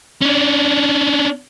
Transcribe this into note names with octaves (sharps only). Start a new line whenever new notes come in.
C#4 D4